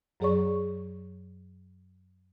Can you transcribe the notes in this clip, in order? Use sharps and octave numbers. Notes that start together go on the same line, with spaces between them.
F#2 F#3 G#4 C#5 D5 C#6